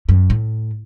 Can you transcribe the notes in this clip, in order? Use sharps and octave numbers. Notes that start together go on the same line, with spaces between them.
F#2
A2